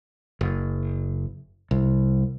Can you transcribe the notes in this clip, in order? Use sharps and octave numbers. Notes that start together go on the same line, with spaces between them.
F#1
C2